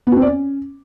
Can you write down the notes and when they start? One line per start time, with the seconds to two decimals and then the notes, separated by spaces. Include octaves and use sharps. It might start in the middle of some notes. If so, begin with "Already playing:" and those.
0.07 B3
0.12 F#4
0.17 C4
0.22 D5
0.27 C#4